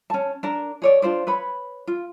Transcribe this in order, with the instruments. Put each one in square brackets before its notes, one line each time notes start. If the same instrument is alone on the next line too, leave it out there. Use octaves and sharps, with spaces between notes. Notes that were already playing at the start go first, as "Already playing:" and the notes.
[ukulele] C#4 A5
D4 A#4
G#4 C#5 D5
D4 F4 C5 D5
B4 C#5 B5
F4